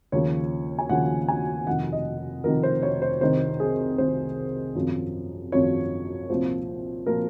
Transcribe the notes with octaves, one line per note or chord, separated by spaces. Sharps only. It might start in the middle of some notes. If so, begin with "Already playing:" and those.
D#2 C#3 F3 C#5
G#5
D#2 C#3 F3 F#5
G#5
F1 F2 D#3 F#5
D#5
F1 F2 D#3 A#4
C5
C#5
C5
C2 C3 D#3 C5
G#4
C2 C3 D#3 C5
G#1 F#2 F3
G#1 F#2 F3 C#5
C2 A#2 F3 C5
A#2 F3 A#4